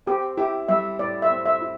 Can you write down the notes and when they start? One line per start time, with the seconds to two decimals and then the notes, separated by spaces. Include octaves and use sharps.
0.06 C4 G4
0.37 E4 G4
0.68 G3 E5
0.99 A2 D5
1.22 E5
1.30 C4
1.46 E5
1.61 E4